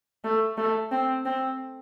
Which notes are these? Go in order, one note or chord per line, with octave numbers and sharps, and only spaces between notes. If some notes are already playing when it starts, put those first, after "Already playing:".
A3
A3
C4
C4